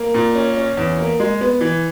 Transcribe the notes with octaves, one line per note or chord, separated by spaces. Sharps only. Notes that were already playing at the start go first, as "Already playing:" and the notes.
Already playing: A#3
A#2
C#4
C#4
E2
A#3
G#3
B3
E3